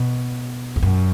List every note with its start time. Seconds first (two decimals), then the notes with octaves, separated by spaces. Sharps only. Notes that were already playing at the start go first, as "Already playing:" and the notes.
Already playing: B2
0.76 E2
0.82 F#2